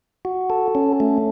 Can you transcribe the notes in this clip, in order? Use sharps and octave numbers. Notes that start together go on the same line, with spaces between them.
F#4
A4
C#4
A3